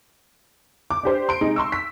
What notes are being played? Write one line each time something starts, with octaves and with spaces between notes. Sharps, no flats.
D6
D4 G4 C5
C6 D7
C3 G#3 D#4
C6 C#6 E6
B6